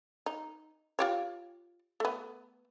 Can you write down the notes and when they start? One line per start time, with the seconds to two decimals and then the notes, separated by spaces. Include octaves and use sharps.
0.26 D#4
0.99 F4 G4 C#5
2.00 A3 B3